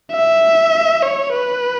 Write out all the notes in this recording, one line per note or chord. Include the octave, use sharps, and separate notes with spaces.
E5
C#5
B4